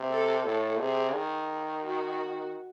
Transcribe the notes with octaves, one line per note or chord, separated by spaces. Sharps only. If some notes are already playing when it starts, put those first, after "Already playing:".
Already playing: C3
A4
A2 A4
C3 G#4
D#3
F#4